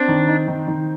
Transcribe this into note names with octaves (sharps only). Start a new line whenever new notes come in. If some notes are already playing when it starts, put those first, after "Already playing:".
Already playing: C4 D4
D#3
D#4
D#3
D#3